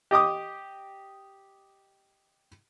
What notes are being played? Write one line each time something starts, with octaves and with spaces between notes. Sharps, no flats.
G4 D#5 D6 D#6